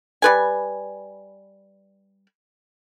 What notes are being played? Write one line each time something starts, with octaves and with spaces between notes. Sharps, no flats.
G3 B4 G#5